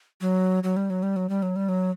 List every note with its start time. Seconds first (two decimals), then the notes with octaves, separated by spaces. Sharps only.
0.21 F#3
0.63 F#3
0.76 G3
0.90 F#3
1.03 G3
1.16 F#3
1.29 G3
1.42 F#3
1.56 G3
1.68 F#3